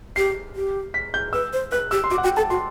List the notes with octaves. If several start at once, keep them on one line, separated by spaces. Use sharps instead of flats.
G4 C7
G4
B6
G6
B4 E6
C5
B4 F#6
G4 E6
C6
F#4 D6
F#5
F#4 G5
A4 A5
F#4 C6